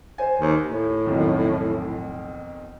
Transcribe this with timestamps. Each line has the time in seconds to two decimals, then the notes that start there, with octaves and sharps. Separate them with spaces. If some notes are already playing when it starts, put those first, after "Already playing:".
0.18 C5 G#5
0.40 D#2
0.63 A2
1.06 B1 F2 D#3